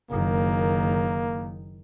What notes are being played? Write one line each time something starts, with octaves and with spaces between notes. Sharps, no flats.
F#1 D#3 A#3